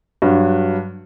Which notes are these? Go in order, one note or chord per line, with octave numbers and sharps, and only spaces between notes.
G2 F#3